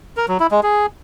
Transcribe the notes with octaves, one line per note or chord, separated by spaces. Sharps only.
A#4
F#3
E4
G#3
G#4